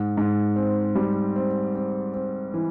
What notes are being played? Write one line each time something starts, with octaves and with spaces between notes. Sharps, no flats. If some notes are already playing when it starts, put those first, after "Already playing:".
Already playing: G#2
G#2
C4
G3
C4
C4
C4
E3